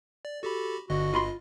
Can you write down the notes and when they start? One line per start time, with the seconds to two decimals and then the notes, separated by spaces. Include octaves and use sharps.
0.25 D5
0.43 F#4 G4 A4 B5
0.90 G1 G2 D3 F#4 D#5
1.14 F4 B5 C6